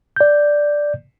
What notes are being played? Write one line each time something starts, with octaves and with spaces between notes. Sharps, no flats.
D5 G6